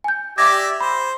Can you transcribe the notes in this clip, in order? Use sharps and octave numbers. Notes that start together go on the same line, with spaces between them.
G#5 G6
G4 D5 E5 D6 G#6 A#6
C5 B5